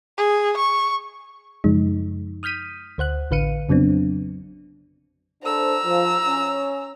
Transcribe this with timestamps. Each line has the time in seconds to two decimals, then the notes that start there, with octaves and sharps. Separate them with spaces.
0.18 G#4
0.57 C#6
1.64 F#2 C#3 F3 G#3 D#4
2.43 D#6 F6 G6 B6 D#7
2.98 D2 C5 F#5 F#6
3.31 A1 D3 B4 F5 C#7 D#7
3.69 F2 C#3 F#3 B3 C4 D4
5.43 D4 A4 C5 A#5 E6
5.84 F3
6.27 C#4